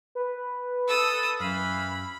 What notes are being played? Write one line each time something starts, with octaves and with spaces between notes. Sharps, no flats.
B4
A4 D#6 E6
F#2 E3 F5 B5